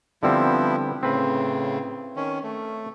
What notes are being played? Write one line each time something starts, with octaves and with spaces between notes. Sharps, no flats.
D3 F3 G3 B3 C4 E4
A2 C#3 C4 B4
D#3 C#4
A3